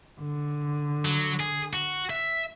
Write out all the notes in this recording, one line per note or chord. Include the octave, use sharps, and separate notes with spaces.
D3
F#3
G#4
F#4
E5